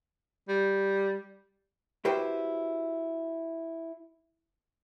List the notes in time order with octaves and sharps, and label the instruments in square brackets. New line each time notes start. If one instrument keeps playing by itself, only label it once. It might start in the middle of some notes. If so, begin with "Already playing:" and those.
[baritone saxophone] G3
[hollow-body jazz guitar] E4 F#4 G4 B4 C5 G5